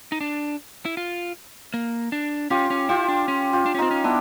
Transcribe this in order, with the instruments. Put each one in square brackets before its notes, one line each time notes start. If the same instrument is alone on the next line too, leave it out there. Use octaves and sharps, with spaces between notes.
[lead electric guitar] D#4
D4
E4
F4
A#3
D4
[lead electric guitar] C#4 [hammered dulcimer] F4 G4
[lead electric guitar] C#4
[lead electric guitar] E4 [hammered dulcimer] F4 G4
[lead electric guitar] D4
C#4
[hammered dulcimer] F4 G4
[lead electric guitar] D4
C#4
[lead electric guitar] C4 [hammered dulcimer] D#4 F4
[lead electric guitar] C#4
[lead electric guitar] B3 [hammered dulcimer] D4 E4